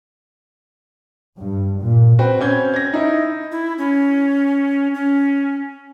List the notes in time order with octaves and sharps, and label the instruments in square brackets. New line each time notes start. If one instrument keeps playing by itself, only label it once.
[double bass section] G2
A#2
[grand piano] C4 F#4 B4 G5
C4 C#4 G6 G#6
G#6 A#6
D#4 E4
[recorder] E4
C#4
C#4